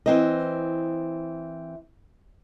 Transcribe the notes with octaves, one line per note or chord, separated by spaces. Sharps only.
E3 C4 D#5